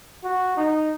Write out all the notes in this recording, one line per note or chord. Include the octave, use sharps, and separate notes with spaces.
F#4
D#4